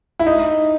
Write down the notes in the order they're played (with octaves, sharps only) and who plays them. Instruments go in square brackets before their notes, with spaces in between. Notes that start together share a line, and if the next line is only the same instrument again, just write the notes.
[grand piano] E4
D#4